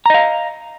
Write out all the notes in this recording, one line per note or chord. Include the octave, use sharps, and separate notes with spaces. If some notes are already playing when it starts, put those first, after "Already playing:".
D#5 F5 A#5